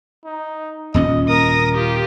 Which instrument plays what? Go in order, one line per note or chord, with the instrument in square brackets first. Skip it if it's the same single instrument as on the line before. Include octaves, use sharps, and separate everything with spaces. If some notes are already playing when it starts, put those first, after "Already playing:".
[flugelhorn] D#4
[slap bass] D#1 A#2 C#4 [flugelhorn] D#5
[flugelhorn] A#4 [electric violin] D#6 A#6
[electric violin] F4 G4